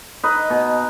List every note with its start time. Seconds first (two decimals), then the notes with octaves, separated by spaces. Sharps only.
0.23 D#4 B4 D#5
0.50 B2